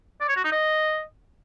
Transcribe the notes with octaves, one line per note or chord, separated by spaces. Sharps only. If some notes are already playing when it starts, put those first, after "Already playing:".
D5
C#5
F#4
D#4
D#5